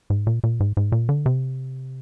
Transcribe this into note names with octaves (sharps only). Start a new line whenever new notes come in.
G#2
A#2
A#2
G#2
G#2
A#2
D3
C3